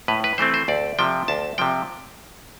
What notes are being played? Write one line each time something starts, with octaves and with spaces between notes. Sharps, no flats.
A2 B4
B4
E3 A3 C4 C5
C5
D2 D5
C3 F3 G5
D2 A5
C3 F3 G5